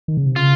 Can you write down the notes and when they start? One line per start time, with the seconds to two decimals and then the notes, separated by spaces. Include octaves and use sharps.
0.08 D#3
0.17 C#3
0.26 C3
0.35 C#3 F4